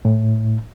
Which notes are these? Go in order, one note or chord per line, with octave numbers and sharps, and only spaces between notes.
A2